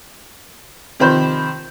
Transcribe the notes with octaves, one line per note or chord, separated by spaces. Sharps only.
C3 D#3 F3 C5 B5 G6